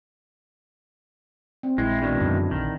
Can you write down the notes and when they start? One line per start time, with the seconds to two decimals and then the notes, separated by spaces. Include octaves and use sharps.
1.63 C4
1.78 A#1 G#3 E4
2.02 B2 D#3 G#3 D4
2.21 F#2 D3 F3 F#3
2.51 A#1 D#3